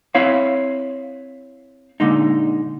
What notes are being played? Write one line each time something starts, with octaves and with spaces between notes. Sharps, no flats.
C4 E4 C#5 F5
A#2 D3 G#3 D#4